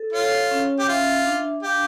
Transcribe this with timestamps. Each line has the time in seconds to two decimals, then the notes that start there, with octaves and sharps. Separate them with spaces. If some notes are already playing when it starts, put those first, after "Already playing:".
Already playing: A4
0.13 F4 C#5
0.51 C#4
0.79 G4
0.88 F4 E5
1.26 D4
1.63 G4 F5